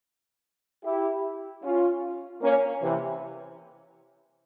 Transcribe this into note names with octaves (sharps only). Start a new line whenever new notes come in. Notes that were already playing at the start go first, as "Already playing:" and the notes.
E4 G4
C#4 F4
A#3 C#4
C3 E3